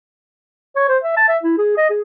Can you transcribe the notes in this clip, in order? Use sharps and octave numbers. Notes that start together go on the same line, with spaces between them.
C#5
C5
E5
A5
E5
E4
G#4
D#5
G#4